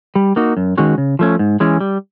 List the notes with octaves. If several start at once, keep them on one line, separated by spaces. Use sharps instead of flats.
G3
A#3 D#4 F#4
F#2
D#3 G#3 C#4 F#4
C#3
F3 A3 C#4
G#2
E3 G#3 C#4
G3